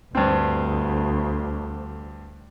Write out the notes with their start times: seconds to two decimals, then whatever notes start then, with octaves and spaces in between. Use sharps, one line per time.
0.15 D2 G2 C4